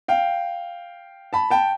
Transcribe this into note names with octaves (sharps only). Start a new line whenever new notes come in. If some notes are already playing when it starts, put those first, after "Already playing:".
F5 G5
A5 B5
G5 A5